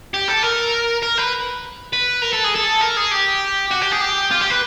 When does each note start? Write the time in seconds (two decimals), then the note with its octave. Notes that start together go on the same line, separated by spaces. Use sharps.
0.14 G4
0.28 A4
0.43 A#4
1.03 A#4
1.18 B4
1.93 B4
2.22 A#4
2.33 A4
2.44 G#4
2.55 A4
2.81 A#4
2.97 G#4
3.11 G4
3.71 F#4
3.81 G4
3.91 G#4
4.01 G4
4.31 F4
4.41 G4
4.50 B4